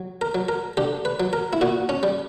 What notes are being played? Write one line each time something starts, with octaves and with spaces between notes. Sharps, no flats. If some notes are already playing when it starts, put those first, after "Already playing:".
Already playing: F#3
A#4
F#3
A#4
D3 G4
B4
F#3
A#4
E4
A#2 F#4
C#4
G3